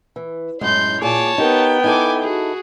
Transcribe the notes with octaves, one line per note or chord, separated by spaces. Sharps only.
E3
F#2 A2 G#3 C6 G6
A#2 G#4 C#5 A5 D6
B3 D#4 G4 A#4 G5
D#4 E4 A4 G#5 D6
F#4 G#4